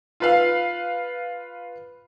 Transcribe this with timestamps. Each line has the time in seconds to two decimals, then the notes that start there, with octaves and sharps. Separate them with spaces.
0.20 F4 B4 F5